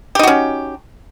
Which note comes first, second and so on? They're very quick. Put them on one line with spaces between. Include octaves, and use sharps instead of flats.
G4 D#4 F#4 C#4